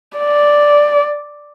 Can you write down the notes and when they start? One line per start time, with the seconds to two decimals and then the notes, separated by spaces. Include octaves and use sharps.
0.18 D5